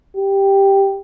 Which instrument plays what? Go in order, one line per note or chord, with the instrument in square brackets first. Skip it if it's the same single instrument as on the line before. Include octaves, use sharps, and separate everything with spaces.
[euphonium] G4